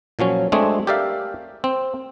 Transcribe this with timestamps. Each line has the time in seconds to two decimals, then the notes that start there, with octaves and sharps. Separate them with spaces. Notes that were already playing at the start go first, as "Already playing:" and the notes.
0.19 A#2 F3 F#3 C#4
0.52 G#3 A3 C4 D4 G#4
0.87 G4 A#4 D5 E5 F5
1.64 C4